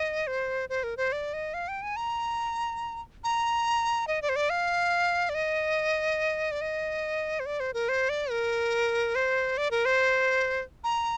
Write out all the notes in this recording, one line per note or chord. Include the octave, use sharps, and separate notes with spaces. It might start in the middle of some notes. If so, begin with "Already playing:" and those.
Already playing: D#5
C5
C5
A#4
C5
D5
D#5
F5
G5
G#5
A#5
A#5
D#5
D5
C5
D5
F5
D5
D#5
D5
D#5
C5
D5
C5
A#4
C5
D5
A#4
C5
D5
A#4
C5
A#5